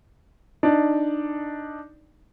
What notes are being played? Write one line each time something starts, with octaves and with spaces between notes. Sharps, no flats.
D4 D#4 D5